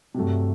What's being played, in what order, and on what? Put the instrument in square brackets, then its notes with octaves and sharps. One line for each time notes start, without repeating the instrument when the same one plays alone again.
[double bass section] G2 [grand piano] C3 F#3 A3